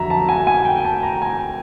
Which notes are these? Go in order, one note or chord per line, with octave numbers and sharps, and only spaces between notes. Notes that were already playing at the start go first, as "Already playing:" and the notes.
Already playing: F2 D3 F#3 E5 A#5
A5
G#5
G#5
G5
A5
A#5
G#5